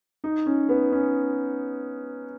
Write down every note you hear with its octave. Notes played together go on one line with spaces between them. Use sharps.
D#4
C#4
B3
C#4